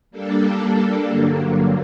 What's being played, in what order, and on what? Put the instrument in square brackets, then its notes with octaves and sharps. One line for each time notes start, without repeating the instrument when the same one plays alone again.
[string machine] G3 A#3 D4 A4
G2 D3 F#3 A#3